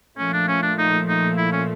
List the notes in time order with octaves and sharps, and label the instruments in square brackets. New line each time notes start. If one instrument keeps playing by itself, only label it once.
[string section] A#2 F3 A3 [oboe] C#4
[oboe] D4
C#4
D4
D#4
D#4
E4
C#4